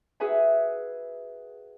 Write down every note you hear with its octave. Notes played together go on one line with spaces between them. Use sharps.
F#4 G#4 B4 E5 G#5